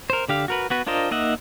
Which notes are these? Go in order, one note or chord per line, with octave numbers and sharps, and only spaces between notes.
A#4 C5
D3 G4 F5
F#4 A#4 B4
B3 F#4 B4
D4 F4 A#4 C5 D#5
A#3 D#4 D#5 E5 F#5